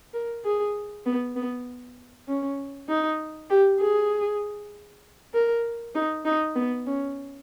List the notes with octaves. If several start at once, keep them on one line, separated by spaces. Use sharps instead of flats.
A#4
G#4
B3
B3
C#4
D#4
G4
G#4
A#4
D#4
D#4
B3
C#4